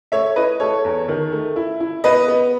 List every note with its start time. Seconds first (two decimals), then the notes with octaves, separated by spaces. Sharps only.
0.12 A3 C#5 E5
0.36 E4 B4 D#5
0.60 A3 A4 C#5
0.84 E2
1.08 D#3
1.32 A3
1.56 E4
1.80 E4
2.04 B3 B4 D#5
2.28 B3